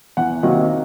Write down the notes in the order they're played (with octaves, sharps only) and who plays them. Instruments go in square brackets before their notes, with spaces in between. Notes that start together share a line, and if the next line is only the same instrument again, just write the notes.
[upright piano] E2 F#5
C3 D#3 F#3 A#3